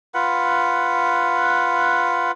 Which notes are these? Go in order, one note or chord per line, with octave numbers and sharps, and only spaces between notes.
F4 B4 F#5